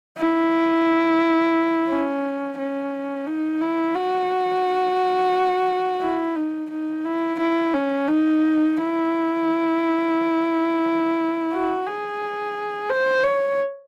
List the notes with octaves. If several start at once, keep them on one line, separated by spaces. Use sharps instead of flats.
E4
C#4
C#4
D#4
E4
F#4
E4
D#4
D#4
E4
E4
C#4
D#4
E4
F#4
G#4
C5
C#5